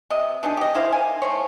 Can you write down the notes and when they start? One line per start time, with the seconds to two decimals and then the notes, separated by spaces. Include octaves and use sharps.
0.10 C3 D#5
0.43 B2 D4 D#4 G#4
0.57 G4 D#5
0.75 D#3 E4 C5 F5
0.92 G#5
1.22 A3 C5 C#5